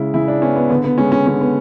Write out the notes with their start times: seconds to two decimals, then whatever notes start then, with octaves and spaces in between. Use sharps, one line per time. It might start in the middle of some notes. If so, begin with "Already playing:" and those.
Already playing: C#3 G#3 E4
0.14 C#3 E4
0.28 D4
0.41 B3 C#4
0.56 B3
0.70 D3 B3
0.84 B3
0.98 G#3 C#4
1.12 C#4
1.26 D3 C#4
1.41 B3